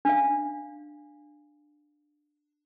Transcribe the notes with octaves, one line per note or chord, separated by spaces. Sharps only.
D4 F5